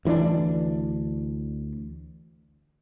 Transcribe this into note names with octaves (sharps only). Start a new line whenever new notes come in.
D2 E3 C4 D4